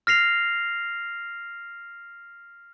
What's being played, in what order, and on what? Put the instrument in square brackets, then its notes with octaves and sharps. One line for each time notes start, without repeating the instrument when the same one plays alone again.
[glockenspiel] F6 A#6 C7 F7